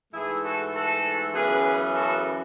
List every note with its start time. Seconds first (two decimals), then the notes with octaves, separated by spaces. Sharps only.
0.13 G#2 E3 A3 E4 G#4
0.43 F#4 A4
0.73 F#4 A4
1.33 F#2 C#3 E3 B3 G#4 B4
1.94 F#4 A4